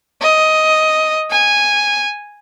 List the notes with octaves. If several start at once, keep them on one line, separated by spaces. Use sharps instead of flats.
D#5
G#5